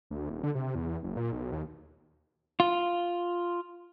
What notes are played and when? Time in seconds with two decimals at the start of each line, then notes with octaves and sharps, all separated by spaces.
0.11 D2
0.29 D#1
0.43 D3
0.55 C3
0.75 E2
1.03 F#1
1.17 A#2
1.32 B1
1.52 D#2
2.60 F4